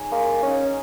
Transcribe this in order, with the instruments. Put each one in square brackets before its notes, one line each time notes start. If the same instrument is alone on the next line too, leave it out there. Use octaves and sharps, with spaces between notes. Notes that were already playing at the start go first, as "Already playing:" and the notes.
Already playing: [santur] D#4 G#4 C#5
[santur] G#3 [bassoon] A#3
[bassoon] C#4 [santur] D#4 A#4